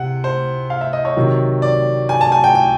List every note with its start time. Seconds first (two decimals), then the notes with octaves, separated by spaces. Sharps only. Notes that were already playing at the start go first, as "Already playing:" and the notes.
Already playing: C3 F#5
0.24 C5
0.70 F5
0.81 E5
0.93 D#5
1.05 C#5
1.16 C3 D#3 F#3
1.62 D5
2.09 G#5
2.21 A5
2.32 G#5
2.44 G5
2.55 G5